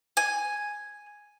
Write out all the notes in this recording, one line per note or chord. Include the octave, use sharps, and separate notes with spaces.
G#5